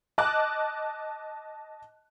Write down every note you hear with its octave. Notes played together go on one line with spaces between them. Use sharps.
D#5 A5 D6 F#6